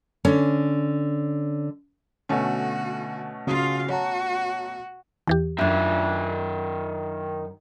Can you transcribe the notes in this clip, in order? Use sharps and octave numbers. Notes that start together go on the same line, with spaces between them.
D3 C#4
B2 D3 A3 C#4 F#4
C#3 F4 F#4 F5 D#6
F#4 C#5 A5 A#5
E2 E3 G4
F#2 D#3 D4 E5